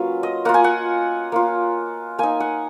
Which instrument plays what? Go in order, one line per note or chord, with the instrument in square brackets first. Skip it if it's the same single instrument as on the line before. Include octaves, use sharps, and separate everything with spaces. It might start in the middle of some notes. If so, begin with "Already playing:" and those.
Already playing: [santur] F#3 A#3 C#4 F4 B4
D#5
A#3 F4 F#5
G#5
F#5
A#3 F4
A#3 D#4 G#5
F#5